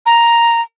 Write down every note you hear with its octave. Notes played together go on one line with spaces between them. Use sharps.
A#5